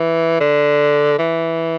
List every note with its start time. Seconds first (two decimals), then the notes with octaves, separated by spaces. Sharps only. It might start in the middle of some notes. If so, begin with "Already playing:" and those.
Already playing: E3
0.41 D3
1.19 E3